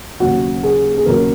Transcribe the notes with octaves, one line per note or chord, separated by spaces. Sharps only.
D#2 C#3 F#3 F#4
G#4
G#4
D#2 C#3 F#3 A#4